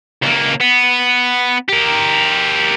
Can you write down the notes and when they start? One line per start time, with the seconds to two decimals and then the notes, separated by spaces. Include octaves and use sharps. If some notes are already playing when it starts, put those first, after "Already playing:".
0.23 C#2 A#3
0.61 B3
1.69 G4 A#4